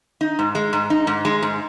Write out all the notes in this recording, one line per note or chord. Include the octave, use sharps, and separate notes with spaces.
D#4
G#2
G#3
G#2
D#4
G#2
G#3
G#2